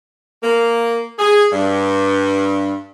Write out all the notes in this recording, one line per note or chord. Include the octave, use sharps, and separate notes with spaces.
A#3
G#4
G2